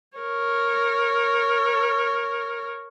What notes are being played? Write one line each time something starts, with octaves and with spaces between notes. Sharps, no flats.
A#4 C#5